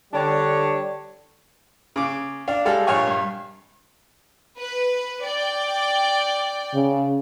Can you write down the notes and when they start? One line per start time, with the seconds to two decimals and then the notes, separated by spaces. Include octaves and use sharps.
0.13 D3 G3 D4 C#5
1.96 C#3 D6
2.48 D4 F5
2.65 G3 G#3 A4 F5
2.87 A#1 C#5 F5 G#5 C#6
3.07 G2
4.59 B4
5.25 D5 G5
6.74 C#3